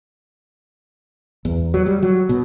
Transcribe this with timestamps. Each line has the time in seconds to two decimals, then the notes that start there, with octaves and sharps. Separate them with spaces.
1.45 E2
1.74 F#3
1.86 G3
2.03 F#3
2.29 B2